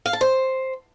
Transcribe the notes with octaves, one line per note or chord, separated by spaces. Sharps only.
F5
A5
C5